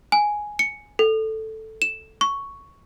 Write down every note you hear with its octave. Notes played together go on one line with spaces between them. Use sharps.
G#5
C#7
A4
E7
C#6